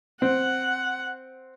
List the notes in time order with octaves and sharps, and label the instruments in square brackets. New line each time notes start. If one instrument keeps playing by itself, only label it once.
[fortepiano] C4 [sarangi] F#5